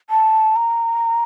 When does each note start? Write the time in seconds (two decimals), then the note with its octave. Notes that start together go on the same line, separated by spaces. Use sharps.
0.10 A5
0.56 A#5